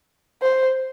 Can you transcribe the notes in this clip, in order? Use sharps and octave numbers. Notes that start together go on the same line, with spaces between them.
C5